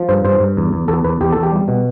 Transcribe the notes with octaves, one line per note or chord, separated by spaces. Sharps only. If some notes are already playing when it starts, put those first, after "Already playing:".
Already playing: F3
G2 C5
G2 C5
G2
E2
E2
E2 A4
E2 B4
E2 G4
E2 A4
G4
G3
B2